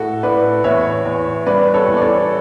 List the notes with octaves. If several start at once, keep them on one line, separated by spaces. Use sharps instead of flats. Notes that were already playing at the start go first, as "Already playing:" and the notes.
Already playing: A2 F#4 A4
A2 B4 D5
E2 C#5 E5
E2
G3 B4 D5
A4 C#5
E2
D5
A4 C#5